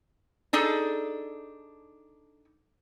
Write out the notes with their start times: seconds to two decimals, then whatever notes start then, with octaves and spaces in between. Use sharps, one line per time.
0.53 D4 D#4 G#4 A4